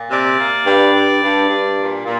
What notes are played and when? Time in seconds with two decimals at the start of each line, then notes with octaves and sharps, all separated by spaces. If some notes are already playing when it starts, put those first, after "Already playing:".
Already playing: A#2
0.10 C3 D5
0.37 A#3
0.66 G2
0.93 G2
1.22 G2
1.49 G2
1.77 A#2
2.04 A#2